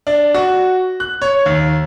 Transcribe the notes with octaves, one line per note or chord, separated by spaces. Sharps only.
D4
F#4
F#6
C#5
D#2